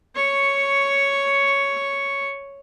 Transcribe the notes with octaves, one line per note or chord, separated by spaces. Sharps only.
C#5 C#6